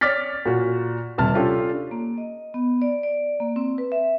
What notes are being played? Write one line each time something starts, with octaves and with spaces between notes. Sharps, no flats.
C#5 D5 D6 F6 A6 B6
A#2 F#4
D#1 C3 A5 F6
C#4 D4 F4 G4 A4
A#3
D#5
B3
D5
D5
A#3
C4
B4
E5